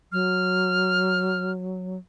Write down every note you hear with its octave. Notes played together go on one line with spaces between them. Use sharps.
F#3 F6